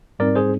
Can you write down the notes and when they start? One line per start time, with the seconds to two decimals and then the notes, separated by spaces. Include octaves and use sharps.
0.19 G#2 G3 C4 D#4 A#4 D5
0.35 G#4 C5